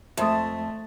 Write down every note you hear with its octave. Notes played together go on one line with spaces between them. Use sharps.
F2 A3 E5 C6 D#6